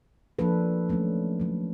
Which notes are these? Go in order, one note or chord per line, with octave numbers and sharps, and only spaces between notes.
F3 A#3 D4 A4 B4
D#3 F#3 A3 C#4
D#3 F#3 A3